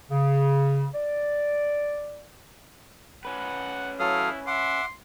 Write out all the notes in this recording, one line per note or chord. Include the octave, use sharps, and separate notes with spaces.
C#3
D5
C#4 B4 F#5
F#3 E4 A4 F5 D#6
E5 F#5 C6 D6